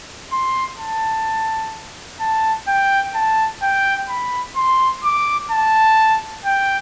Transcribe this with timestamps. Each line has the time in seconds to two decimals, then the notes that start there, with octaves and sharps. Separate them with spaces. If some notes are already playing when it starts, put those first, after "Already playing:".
0.32 C6
0.79 A5
2.20 A5
2.68 G5
3.15 A5
3.62 G5
4.09 B5
4.56 C6
5.04 D6
5.51 A5
6.45 G5